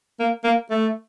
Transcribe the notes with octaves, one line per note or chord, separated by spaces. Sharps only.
A#3
A#3
A3